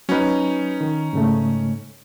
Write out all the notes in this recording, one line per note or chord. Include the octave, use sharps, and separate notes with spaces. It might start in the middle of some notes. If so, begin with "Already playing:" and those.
F#3 C#4 D#4 B4
D#3
G#2 C#3 A3